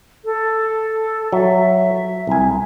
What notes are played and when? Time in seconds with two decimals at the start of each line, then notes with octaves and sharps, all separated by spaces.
0.25 A4
1.33 F#3 E5
2.27 C2 G#5